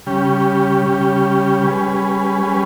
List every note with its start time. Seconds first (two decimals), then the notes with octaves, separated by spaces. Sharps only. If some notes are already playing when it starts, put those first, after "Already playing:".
0.06 C#3 G3 C#4 G4
0.85 C#3 G3 C#4 G4
1.63 G3 C#4 G#4 B4
2.43 G3 C#4 G#4 B4